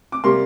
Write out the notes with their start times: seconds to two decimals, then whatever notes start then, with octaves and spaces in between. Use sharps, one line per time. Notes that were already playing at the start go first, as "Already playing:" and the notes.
0.12 D6
0.24 C3 G3 A#3 C6